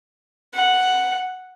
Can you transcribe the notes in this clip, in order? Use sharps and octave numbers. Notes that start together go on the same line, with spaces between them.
F#5